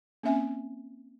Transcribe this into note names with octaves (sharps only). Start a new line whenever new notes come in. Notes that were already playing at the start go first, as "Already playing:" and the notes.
A#3 C4 C#4 E5 G#5